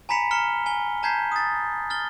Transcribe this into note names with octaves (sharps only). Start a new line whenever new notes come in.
G#5 A#5 B5 B6 C#7 F7
A#5 F6 C#7 G7
G#5 G7
A5 A#5 G6 G#6 B6 C7
D#6 A6
F6 A6 G7